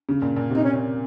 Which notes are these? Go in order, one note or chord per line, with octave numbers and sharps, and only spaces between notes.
C#3
A#2
A#2
C3
D#4
C#4